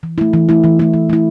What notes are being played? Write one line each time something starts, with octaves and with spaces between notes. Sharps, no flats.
E3
A3 E4
E3
A3 E4
E3
A3 E4
E3
A3 E4